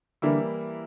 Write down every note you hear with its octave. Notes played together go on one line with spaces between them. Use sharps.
D3 E3 G3 A#3 E4